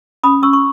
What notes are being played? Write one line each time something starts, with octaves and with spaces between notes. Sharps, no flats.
C#4 B5 D#6
C#4 C#6 E6
C#6